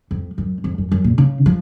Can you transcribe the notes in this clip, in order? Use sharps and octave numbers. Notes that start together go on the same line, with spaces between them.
F2
F#2
F2
F#2
F#2
A#2
C#3
F3